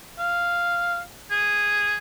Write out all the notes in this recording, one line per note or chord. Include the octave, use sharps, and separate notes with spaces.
F5
G#4